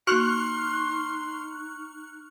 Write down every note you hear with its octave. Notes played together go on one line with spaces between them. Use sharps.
A#3 D#4 F#4 C6 C#6 F6 F#6